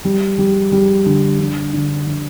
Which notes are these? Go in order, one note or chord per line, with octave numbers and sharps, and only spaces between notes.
G3
G3
G3
D3
D3
D3
D3